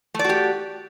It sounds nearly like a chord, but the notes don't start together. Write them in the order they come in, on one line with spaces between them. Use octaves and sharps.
A3 D5 F#4 G4